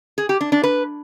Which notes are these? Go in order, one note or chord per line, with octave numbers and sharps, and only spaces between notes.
G#4
G4
D4
D4
B4